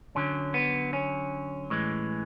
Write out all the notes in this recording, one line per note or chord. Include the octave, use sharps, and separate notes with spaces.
F#2 D3 F#3 C#4
B3
C#4
A2 E3 G#3